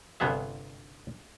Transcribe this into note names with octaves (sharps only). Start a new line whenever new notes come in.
G1 G2 C3 B3 G#4 E5